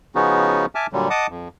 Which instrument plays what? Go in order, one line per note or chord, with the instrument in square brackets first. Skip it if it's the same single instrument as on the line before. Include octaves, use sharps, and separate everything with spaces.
[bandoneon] C#3 F3 B3 C#4 D#4 F#4
E5 G#5 A5 D6 F6
A#2 D3 F#3 G3
D#5 F#5 A5 D6 D#6
F2